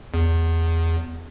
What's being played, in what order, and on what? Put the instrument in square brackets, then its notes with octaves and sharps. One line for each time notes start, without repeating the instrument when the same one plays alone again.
[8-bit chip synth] E2